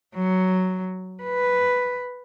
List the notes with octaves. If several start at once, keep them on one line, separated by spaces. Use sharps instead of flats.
F#3
B4